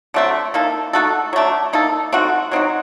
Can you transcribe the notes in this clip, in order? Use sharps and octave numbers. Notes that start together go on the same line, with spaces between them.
D3 F#3 A3 C4
A#3 D#4 A4
A3 D#4 F#4 A4
F#3 A3 D4
A#3 D#4 A4
A3 C4 D#4 F#4
F#3 C4 D#4 F#4